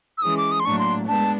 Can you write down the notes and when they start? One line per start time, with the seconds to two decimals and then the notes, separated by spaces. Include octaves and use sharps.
0.18 E6
0.22 E3 G#3 C#4 D#6
0.37 D6
0.52 D#6
0.60 C6
0.65 A2 F#3 A#3 D4 C#6
0.79 C6
1.07 G#3 B3 D4 A5